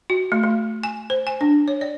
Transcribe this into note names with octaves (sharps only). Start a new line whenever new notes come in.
F#4
A3
A3
G#5
C5
G#5
D4
C#5
D5